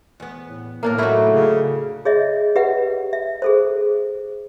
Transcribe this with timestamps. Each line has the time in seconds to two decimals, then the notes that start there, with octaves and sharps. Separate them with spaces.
0.20 E2 B3
0.47 A2
0.83 A2 A#3 D4 A#4
0.98 F#3 A3 D#4 E4 F#4
1.32 C#3
2.05 G#4 C#5 D#5 E5
2.56 G4 B4 E5 F#5
3.13 E5
3.42 G#4 A4 C5